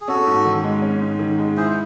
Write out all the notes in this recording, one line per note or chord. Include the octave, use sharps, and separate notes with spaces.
G#4
C#4 F#4 A4
G#2
D#3
G#3
C#4
G#2
D#3
G#3
E4 G#4 C5